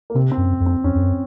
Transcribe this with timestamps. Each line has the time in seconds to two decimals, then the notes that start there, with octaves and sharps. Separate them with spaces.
0.10 A#3
0.15 C3 C4
0.32 C4
0.37 F#2
0.60 F2
0.66 C4
0.84 F2 C#4
0.95 F2
1.01 F#2